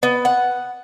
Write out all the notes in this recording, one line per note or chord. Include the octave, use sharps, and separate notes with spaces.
B3
F#5